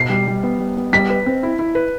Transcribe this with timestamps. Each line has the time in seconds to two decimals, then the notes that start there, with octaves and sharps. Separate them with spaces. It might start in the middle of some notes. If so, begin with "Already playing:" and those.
Already playing: B2 C7
0.10 G3
0.27 G3
0.43 B3
0.59 G3
0.77 B3
0.93 G3 B6
1.10 B4
1.26 C4
1.43 E4
1.59 E4
1.75 B4